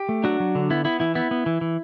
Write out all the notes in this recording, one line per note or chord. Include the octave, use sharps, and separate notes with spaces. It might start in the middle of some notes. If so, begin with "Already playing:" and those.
Already playing: G4
A3
F#3 D4 F#4
F#3
D3
B3 E4
B3 E4
E3 E4
B3 E4
B3
E3
E3